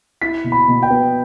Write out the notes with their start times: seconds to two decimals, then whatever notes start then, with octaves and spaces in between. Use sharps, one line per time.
0.22 E4 B6
0.44 B2
0.52 B5
0.68 B2
0.83 G5
0.90 B3